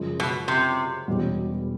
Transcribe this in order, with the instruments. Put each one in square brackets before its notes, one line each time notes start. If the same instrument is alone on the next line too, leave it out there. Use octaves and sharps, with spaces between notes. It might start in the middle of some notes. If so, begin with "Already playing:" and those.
Already playing: [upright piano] F#2 C#3 F3 G#3
[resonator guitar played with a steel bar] B2
C3
[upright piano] E1 E2 B2 G3